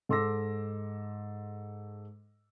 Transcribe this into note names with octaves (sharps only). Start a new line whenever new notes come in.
G#2 A4 C6 D6 E6 A#6